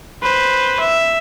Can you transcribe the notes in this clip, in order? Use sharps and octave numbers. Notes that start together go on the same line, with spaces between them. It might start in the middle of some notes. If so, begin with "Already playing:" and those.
B4 C5
E5